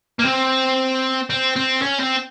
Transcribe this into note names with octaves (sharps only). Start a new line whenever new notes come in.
A#3
C4
C4
C4
C#4
C4